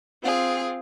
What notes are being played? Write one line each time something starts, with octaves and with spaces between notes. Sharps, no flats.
C4 F4 G#4